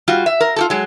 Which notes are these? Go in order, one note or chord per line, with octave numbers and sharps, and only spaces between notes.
G3 F4 F#4
E5
A#4
F4 G4 A4
F#3 G#3